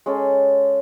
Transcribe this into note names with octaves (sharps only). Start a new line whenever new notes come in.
G#3 C#4 G#4 A4